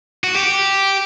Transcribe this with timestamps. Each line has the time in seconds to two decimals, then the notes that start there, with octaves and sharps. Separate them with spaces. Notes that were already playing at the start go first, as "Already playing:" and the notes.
0.24 F#4
0.36 G4